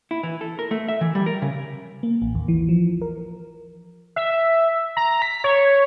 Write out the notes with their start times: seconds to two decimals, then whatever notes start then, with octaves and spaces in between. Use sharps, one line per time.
0.11 E4
0.23 E3
0.41 A4
0.59 A#4
0.71 A3
0.88 E5
1.01 E3
1.15 G3
1.26 A#4
1.42 C#3
2.03 A#3
2.22 A1
2.35 D#2
2.48 E3
2.69 F3
3.01 A#4
4.16 E5
4.97 A#5
5.22 B6
5.44 C#5